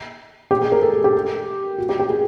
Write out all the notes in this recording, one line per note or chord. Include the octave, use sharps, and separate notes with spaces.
G4
G#4
A#4
A4
G#4
G4
F#4
G4
G4
G#4